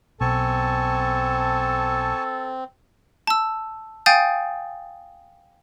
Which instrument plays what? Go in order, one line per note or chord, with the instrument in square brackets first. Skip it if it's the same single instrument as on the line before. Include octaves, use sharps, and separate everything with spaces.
[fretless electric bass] B1 B2 [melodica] C4 [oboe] A4 [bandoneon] G#5 A5 C#6
[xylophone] A5 E6
F5 G5 G#5 D#6 G6 A6